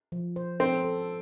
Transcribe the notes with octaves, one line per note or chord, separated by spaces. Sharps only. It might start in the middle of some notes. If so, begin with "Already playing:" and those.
F3
C5
C4 A4
A4